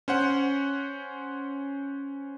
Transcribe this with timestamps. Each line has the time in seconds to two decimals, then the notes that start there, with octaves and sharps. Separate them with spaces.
0.08 C#4 C5 F#5